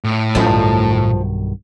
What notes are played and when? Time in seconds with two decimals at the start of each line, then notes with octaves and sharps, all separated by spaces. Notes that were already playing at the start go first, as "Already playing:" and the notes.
0.04 A2
0.35 A1 F3 F#3 A3 C#4 D#4
0.49 B1 G2 D#3